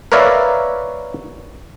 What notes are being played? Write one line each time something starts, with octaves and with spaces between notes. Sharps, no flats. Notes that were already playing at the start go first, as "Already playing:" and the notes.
A#4 B4 C#5 D5 E5 F5